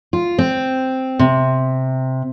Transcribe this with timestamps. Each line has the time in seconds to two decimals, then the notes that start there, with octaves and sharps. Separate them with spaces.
0.13 F4
0.38 C4
1.19 C3